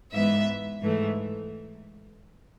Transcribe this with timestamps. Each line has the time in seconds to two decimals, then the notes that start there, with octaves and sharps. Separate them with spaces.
0.13 G#2 E3 B3 E5
0.80 G#2 E3 A3